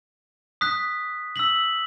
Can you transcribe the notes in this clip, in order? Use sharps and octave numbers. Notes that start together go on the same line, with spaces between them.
D#6 F#6 B6
E6 B6 F#7